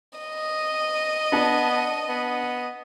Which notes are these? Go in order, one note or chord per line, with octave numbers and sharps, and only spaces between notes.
D#5
B3 D4 A5
B3